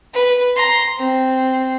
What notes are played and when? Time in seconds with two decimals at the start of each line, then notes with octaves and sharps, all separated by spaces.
0.14 B4
0.56 A#5 C6
0.98 C4